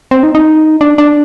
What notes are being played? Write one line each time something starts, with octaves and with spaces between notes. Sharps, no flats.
C4
D#4
D#4
D4
D4